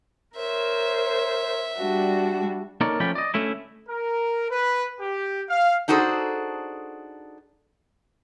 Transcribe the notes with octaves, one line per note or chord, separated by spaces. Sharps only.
A#4 C5 C#5 E5
G3 D4 F#4
A#3 D#4 A4 A#4 C#5 D5
F3 A3 C#4 D5 G5 B5
D5 D#5
D2 A3 C#4 E4
A#4
B4
G4
F5
D4 D#4 F#4 G#4 A4 C5